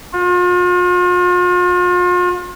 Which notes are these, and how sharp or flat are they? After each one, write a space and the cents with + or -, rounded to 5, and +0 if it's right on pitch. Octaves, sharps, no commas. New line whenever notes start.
F4 +40